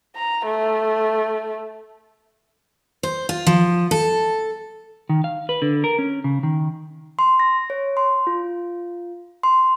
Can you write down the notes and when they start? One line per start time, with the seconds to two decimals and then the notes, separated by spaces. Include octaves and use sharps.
0.16 A#5
0.46 A3
3.03 C5
3.29 F4
3.46 F3
3.91 A4
5.09 D#3
5.24 F5
5.49 B4
5.62 D3
5.84 A#4
5.99 C#4
6.24 C#3
6.43 D#3
7.19 C6
7.40 A#6
7.70 C#5
7.97 C6
8.27 F4
9.43 C6